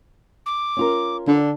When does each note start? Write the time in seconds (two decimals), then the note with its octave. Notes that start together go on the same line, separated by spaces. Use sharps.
0.46 D6
0.77 C#4 F4 A#4
1.28 D3 D4